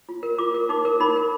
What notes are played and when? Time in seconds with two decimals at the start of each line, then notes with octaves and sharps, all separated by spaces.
0.09 F4
0.23 A#4
0.38 F4 D6
0.54 A#4
0.69 D#4 D6
0.85 A#4
1.00 D#4 B5
1.16 A#4